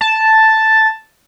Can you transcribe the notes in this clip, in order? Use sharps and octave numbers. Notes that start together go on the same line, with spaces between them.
A5